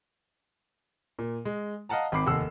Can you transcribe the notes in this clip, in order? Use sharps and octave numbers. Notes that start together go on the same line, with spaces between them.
A#2
G#3
D#5 F5 F#5 A5 A#5
G#1 C4 B5 D6 C7
F1 D#2 F#5 E6